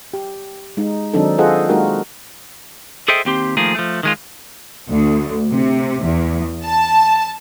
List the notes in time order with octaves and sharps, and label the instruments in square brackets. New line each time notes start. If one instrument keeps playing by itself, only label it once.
[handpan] G4
G#3 D#4
D#3 F#3 C4 D4 D#4 A4
F4 G#4 A4 C5 D#5 F#5
G#3 A#3 D#4 F#4 G4 A#4
[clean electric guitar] G#4 A4 C5 D#5 E5 G5
D#2 C4 G4 C6
D#3 F3 A3 A#3 G#4
F3 A3
D#3 G#3 F4
[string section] D2
C3
E2
A5